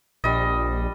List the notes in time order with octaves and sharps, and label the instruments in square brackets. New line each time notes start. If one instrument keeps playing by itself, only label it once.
[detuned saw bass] A#1 [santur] G3 D#5